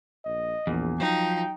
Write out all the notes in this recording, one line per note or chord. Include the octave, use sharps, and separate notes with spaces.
A#1 D#5
A#1 E2
F3 F#3 D#4 G5